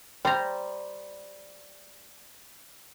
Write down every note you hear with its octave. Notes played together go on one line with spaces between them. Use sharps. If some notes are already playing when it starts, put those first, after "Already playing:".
G3 C5 A#5